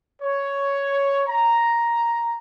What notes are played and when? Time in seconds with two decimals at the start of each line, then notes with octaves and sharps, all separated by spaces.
0.22 C#5
1.28 A#5